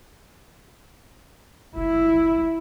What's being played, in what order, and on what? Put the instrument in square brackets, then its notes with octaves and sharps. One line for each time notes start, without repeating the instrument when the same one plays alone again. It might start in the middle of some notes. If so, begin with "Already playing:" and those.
[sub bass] F#1 [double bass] E4